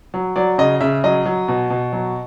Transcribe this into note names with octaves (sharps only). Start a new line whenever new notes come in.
F#3
F#3 D5
C#3 D#5
C#3 E5
F#3 D#5
F#3
B2
B2
F#3